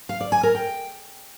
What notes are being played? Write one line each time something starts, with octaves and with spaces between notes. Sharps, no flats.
F5
D5
G#5
A#4
G5